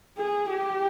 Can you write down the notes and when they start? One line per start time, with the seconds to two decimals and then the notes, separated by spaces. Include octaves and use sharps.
0.18 G#4
0.50 G4